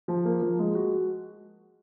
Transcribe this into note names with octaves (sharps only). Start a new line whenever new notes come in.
F3
A#3
F3
G#3
F#4